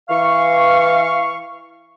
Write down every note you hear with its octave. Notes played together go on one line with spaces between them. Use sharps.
E3 F5 C#6